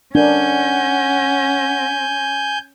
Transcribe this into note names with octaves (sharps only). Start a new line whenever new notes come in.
C#4 D4 A#4 F#5 G#5 G6